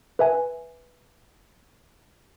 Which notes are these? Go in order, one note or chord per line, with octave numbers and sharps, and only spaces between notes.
B4 E5 G#5